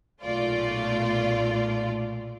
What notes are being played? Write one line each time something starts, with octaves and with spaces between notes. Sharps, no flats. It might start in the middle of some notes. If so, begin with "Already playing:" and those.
B1 A#2 A3 F4 D5